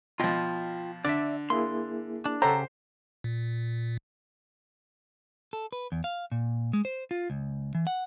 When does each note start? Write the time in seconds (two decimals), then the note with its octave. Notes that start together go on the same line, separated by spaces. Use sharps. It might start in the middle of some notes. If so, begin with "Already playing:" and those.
0.20 B2 F3 F4 D#5 G5
1.05 D3 D5 E5
1.50 A#3 E4 G#4 C6
2.26 D4
2.42 C#3 G4 A4 C5 C#5 F#5 A#5
3.24 A#2
5.53 A4
5.72 B4
5.92 E2
6.04 F5
6.32 A#2
6.73 G#3
6.85 C5
7.11 F4
7.30 C#2
7.75 E3
7.87 F#5